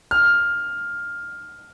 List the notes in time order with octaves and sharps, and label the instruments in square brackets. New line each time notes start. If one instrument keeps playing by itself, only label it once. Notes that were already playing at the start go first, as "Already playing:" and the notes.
[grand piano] F6